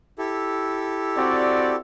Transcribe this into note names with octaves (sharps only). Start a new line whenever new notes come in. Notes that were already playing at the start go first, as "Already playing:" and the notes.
E4 G4 A4
C4 F#4 D5